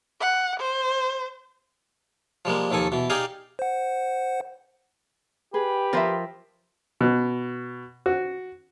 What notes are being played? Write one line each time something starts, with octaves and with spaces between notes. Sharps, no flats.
F#5
C5
F3 G3 G#3 A#3
D#2 D#3 F3 A4 G#5
B2 E3
D#4 G4 G#4 D5 F5 G#5
C5 F#5
G4 G#4 B4
F3 F4 A#4 C5 E5
B2
F#4